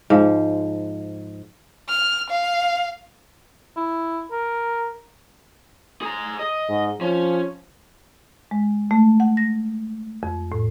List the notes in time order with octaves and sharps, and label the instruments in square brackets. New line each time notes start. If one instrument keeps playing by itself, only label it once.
[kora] G#2 F3
[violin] F6
F5
[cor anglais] E4
A#4
[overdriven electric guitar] G#4 A#5
D#5
[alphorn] G#2
[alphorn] F3 [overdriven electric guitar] C#4
[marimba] G#3
A3
F#5
A#6
F2
A2